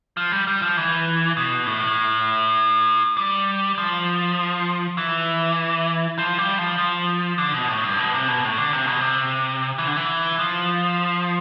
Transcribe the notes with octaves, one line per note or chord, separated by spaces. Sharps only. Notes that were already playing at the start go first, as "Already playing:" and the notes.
F3
G3
G3
F3
E3
B2
A2
G3
F3
E3
F3
G3
F3
F3
D3
B2
A2
G2
B2
C3
B2
A2
D3
C3
B2
C3
E3
D3
E3
F3